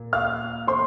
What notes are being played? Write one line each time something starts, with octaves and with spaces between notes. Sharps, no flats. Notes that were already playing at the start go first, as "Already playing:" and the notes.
Already playing: A#2 A#3
F5 F6
C5 C6